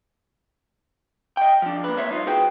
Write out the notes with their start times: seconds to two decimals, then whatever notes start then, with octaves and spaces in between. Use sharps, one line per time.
1.37 D#5 G5
1.62 F3 D4
1.84 A#3 B4
1.96 F2 A#3 C5 C#5 E5
2.09 G2 D#4 F4
2.27 F#4 G#4 B4 C5 G5